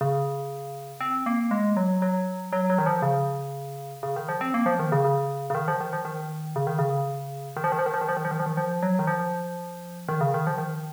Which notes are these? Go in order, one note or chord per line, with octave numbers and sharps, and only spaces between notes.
C#3
C4
A#3
G#3
F#3
F#3
F#3
F#3
D#3
F3
C#3
C#3
D#3
F3
C4
A#3
F3
D#3
C#3
C#3
C#3
D#3
F3
D#3
F3
D#3
C#3
D#3
C#3
D#3
F3
D#3
F3
D#3
F3
D#3
F3
D#3
F3
D#3
F3
D#3
F3
F#3
D#3
F3
D#3
C#3
D#3
F3
D#3